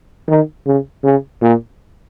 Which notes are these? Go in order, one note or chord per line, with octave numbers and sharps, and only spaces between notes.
D#3
C#3
C#3
A#2